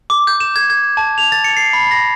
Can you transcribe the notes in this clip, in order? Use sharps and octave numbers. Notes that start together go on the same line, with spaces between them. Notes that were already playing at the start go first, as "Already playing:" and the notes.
D6
G6
E7
G#6
G#6
A5
F7
A6
C#7
C7
B5
A#6